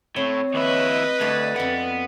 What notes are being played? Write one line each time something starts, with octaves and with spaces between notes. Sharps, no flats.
A2 C4 C#5
D#2 E4 B4 D#5
D2 A3 D4 C#5 A6
F2 B3 D5